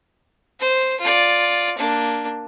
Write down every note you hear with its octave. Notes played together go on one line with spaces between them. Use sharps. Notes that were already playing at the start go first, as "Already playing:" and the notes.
C5
F4 D5
A#3 D4